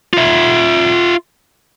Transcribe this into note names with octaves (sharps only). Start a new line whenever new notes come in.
F4 E5